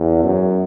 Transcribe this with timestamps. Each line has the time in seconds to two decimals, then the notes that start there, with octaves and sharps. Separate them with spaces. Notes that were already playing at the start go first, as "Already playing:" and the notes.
Already playing: E2
0.24 F#2